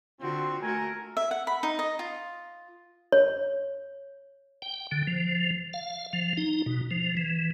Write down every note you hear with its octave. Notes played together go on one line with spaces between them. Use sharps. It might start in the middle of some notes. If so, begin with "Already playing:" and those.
D3 C4 F4 F#4
A3 F#4 A#4 G#5
E5
F#5
B5
D#4
D#5
F4
C#5
G5
D3
F3
F5
F3
D#4
B2
F3
E3